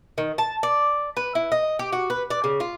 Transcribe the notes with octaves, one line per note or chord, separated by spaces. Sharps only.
D#3
A5
D5
B4
E4
D#5
G4
F#4
B4
D5
C#3
F4